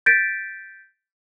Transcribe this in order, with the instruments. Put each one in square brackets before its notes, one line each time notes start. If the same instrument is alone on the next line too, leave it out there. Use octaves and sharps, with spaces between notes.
[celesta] G6 A6 B6 D7